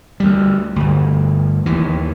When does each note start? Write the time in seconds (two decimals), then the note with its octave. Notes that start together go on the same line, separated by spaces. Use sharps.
0.20 D2 G3
0.76 G1 D2
1.66 D#2 E3